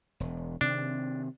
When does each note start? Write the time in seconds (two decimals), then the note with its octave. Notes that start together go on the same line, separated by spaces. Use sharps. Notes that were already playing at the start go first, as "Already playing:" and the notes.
0.20 E1
0.61 C3 D#3 C4 D4